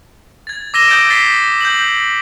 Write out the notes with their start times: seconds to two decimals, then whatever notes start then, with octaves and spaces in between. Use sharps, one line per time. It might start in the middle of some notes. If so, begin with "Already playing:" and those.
0.47 G#6 A6
0.74 D6 E6 A#6 D#7 E7 G7
0.88 D#6 E6 G6 A6 A#6 D7
1.10 A6 B6 C7 G7
1.61 G6 F#7